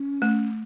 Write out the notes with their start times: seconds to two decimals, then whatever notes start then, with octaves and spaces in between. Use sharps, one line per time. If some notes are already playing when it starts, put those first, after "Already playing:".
Already playing: C#4
0.22 A3